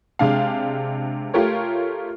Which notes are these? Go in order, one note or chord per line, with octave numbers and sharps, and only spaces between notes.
C3 G#3 D4 F5
A3 F4 G4 A#4 C#5